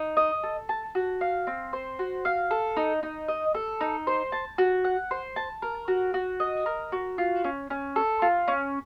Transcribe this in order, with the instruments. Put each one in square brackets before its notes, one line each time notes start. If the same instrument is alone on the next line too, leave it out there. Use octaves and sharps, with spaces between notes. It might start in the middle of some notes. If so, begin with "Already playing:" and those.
Already playing: [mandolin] D#4
D#5
A4
A5
F#4
F5
C4
C5
F#4
F5
A4
D#4
D#4
D#5
A4
D#4
C5
A5
F#4
F#5
C5
A5
A#4
F#4
F#4
D#5
A#4
F#4
F4
C#4
C#4
A4
F4
C#4